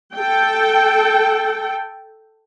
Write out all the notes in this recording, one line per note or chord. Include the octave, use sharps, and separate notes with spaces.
A4 G5